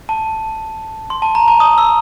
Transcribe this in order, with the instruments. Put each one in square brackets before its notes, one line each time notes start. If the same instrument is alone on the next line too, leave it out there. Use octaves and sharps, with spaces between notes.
[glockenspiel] A5
C6
A5
A#5
A5
D#6
E6